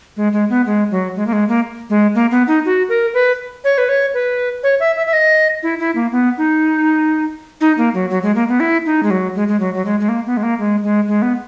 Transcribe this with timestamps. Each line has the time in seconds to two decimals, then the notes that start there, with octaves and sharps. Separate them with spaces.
0.17 G#3
0.33 G#3
0.50 B3
0.66 G#3
0.91 F#3
1.16 G#3
1.27 A#3
1.33 G#3
1.49 A#3
1.90 G#3
2.15 A#3
2.31 B3
2.48 D#4
2.65 F#4
2.89 A#4
3.14 B4
3.64 C#5
3.78 B4
3.89 C#5
4.14 B4
4.63 C#5
4.80 E5
4.96 E5
5.07 E5
5.13 D#5
5.63 E4
5.79 E4
5.95 A#3
6.12 B3
6.38 D#4
7.61 D#4
7.78 A#3
7.94 F#3
8.10 F#3
8.23 G#3
8.35 A#3
8.49 B3
8.60 E4
8.86 D#4
9.03 G#3
9.11 F#3
9.35 G#3
9.48 G#3
9.60 F#3
9.75 F#3
9.85 G#3
10.00 G#3
10.09 A#3
10.26 B3
10.37 G#3
10.43 A#3
10.59 G#3
10.83 G#3
11.08 G#3
11.22 B3